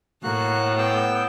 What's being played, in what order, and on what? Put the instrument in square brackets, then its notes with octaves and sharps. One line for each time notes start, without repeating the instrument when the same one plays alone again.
[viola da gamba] A2 [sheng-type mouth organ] A#3 F#4 F#6
[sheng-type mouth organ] B3 G5 E6